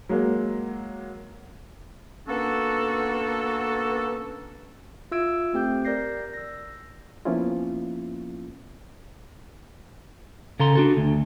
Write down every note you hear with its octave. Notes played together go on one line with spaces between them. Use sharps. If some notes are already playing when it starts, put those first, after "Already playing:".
F#3 G#3 A#3
A#3 B3 C#4 D4 F#4 A4
F4 E5 E6 G#6 D7
A3 C4 G4 G5 G6
A#4 D5 G6 A#6 C7
E6 A#6
F3 A#3 B3 C#4 E4 F4
C#3 A4 A#5 C6
D4 F#4 A4
D2